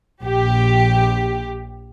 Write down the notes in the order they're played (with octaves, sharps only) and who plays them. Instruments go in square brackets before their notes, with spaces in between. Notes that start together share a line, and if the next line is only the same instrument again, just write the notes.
[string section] A#1 G4